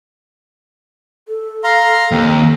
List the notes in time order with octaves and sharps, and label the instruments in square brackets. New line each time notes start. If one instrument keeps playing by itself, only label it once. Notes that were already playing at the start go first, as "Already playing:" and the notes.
[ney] A4
[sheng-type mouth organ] F5 A#5 C6
[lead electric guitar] D#2 [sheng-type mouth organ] C4